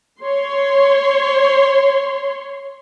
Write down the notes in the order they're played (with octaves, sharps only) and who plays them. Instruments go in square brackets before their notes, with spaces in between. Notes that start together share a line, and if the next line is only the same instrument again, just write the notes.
[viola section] C#5 C6